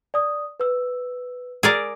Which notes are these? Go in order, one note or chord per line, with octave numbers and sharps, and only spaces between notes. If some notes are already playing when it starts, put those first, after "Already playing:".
D5 D#6
B4 E6
G#4 A#4 D5 A#5 E6